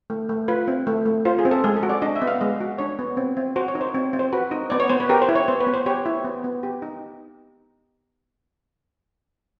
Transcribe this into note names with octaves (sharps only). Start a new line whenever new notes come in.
A3
A3
F4 B4
C4
A3
A3
F4 C5
G#4
C4
A4
G#3 G#4
A4
F#4
D5
D4 D#5
E5
B3
F5
G#3 D#5
F#4
D4 C#5
B3
C4
C4
F#4 C5
C#5
D#4
C5
C4
C4
C5
F#4 B4
D#4
B3 D5
C#5
B3 C5
B4
G4 A#4
C5
E4
C#5
B3 C5
B4
B3
C5
G4 C#5
E4
B3
B3
G4
D#4